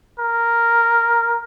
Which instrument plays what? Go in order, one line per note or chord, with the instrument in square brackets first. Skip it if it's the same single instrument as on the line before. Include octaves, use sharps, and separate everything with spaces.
[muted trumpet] A#4